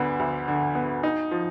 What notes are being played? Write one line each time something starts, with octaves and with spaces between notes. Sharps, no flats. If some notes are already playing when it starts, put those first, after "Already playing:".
Already playing: D2 D3 B3
D2
D3
B3
D#4
F3